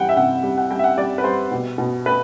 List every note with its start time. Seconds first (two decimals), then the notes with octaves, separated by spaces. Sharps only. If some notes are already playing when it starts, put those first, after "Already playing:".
Already playing: E3 G3 F#5 G5
0.09 E5
0.17 C3 F#5
0.43 G3
0.58 F#5
0.71 G3 G5
0.79 E5
0.84 F#5
0.97 G3 D5
1.18 B4
1.24 G3 C5
1.51 B2
1.78 B2
2.06 A3 B4